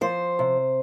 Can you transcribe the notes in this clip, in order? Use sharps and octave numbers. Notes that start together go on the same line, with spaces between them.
F3 C5
C3